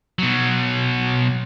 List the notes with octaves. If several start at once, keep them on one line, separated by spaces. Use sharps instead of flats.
B2 F#3